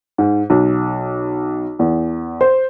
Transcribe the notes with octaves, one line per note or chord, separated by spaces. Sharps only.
G#2
B1
E2
C5